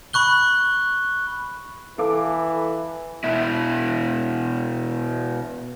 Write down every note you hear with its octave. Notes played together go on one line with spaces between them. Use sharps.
B5 C#6 F#6 G7
E3 A4 F5 D6
B2 E4